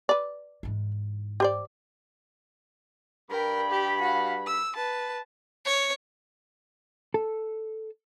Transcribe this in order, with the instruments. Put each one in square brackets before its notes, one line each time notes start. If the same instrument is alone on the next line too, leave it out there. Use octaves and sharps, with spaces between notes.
[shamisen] B4 D5
[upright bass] G#2 E3
[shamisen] G4 C5 D5
[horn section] G2 B5 [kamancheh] A#4 G5
[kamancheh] G4
F#4 F5
E6
B4 A5
[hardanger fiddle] C#5
[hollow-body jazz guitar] A4